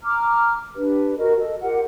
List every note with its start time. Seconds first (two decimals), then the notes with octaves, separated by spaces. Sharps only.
0.03 A#5 D6 F6
0.76 D4 G4 B4
1.17 F#4 A#4 D#5
1.38 A4 D#5
1.61 F4 G4 A#4 F#5